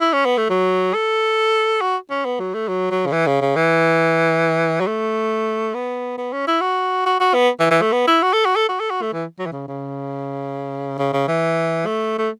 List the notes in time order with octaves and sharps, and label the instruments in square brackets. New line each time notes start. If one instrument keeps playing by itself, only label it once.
[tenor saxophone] E4
C#4
B3
A3
F#3
A4
F#4
C#4
B3
F#3
A3
F#3
F#3
C#3
E3
C#3
C#3
E3
F#3
A3
B3
B3
C#4
E4
F#4
F#4
F#4
B3
E3
E3
A3
B3
E4
F#4
A4
F#4
A4
F#4
A4
F#4
A3
E3
F#3
E3
C#3
C#3
C#3
C#3
E3
A3
A3